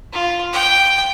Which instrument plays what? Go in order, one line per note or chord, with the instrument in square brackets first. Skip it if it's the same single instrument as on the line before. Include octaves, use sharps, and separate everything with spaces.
[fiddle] F4
G5